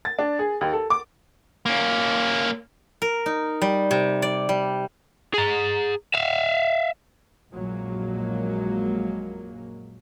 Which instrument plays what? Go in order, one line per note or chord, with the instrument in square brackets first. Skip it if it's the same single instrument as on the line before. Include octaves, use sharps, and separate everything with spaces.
[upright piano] A6
D4
G#4
D#2
A4
D6
[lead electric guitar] A#3 C#4
[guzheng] A#4
D#4
G3
C3
D5
G3
[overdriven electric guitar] G#4 A#5
E5 F5
[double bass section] A#1 F#2 F#3 G#3 A#3